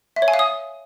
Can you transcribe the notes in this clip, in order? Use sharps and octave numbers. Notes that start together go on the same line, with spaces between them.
E5
C#5
G#5
F5
D#6